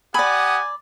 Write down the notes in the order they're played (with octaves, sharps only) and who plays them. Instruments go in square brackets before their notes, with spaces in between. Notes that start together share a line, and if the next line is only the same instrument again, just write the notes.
[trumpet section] G4 F#5 D#6 [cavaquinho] D5 B5 [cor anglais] G#5